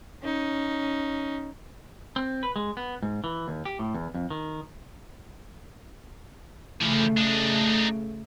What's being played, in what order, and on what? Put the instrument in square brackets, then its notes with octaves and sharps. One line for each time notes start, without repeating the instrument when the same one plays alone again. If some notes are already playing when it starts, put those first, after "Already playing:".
[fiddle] C#4 D#4
[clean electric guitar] C4
B4
G#3
B3
G#2
E3
D#2
G4
A2
E2
F2
D#3
[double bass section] C#3 A3 [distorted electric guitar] E3 F3
[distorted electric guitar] D4 D#4